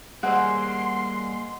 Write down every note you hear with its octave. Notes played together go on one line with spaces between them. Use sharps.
G3 G#3 A#3 C5 F#5 C6 E6